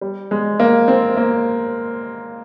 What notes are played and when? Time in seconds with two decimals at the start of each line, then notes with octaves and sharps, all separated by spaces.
0.01 G3
0.31 G#3
0.60 A#3
0.88 C4
1.17 A#3